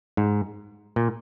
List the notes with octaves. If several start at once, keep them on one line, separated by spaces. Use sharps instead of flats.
G#2
A#2